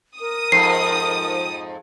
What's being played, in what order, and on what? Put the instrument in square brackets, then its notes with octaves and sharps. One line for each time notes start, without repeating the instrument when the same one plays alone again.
[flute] A#4 [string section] D#6
[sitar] F2 G#2 C4 [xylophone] C7